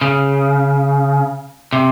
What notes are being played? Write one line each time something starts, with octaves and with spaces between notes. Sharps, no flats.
C#3
C3